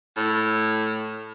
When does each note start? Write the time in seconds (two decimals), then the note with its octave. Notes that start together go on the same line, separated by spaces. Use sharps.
0.17 A2